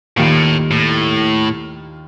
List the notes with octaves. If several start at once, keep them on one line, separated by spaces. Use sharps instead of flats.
D#2 A2 D#3 G3 A#3 F4
A2